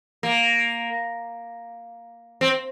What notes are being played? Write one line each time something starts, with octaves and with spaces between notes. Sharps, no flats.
A#3
C4